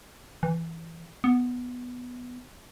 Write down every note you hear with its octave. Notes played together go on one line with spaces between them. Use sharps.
E3
B3